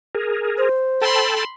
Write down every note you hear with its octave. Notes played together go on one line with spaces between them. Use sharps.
G#4 A#4
C5
A4 G5 A5 B5 C6